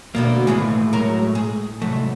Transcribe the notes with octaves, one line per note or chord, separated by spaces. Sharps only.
D2 B2 D3 A#3
D#2 A2 E3 G#3 A3 G#4
F#3 A#4
G#4
C2 G#2 F#3 A3